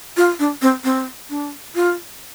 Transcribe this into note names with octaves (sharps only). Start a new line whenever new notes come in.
F4
D4
C4
C4
D4
F4